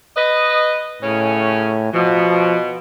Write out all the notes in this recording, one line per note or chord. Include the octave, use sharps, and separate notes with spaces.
B4 D#5
A2 C#3 C#4
B2 F3